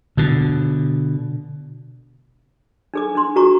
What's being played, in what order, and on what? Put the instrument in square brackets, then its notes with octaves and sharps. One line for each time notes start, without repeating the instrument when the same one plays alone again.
[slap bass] B2 D3
[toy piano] D4 G#4 D6
D4 C6
F4 F#4 G#4 A#5 C#6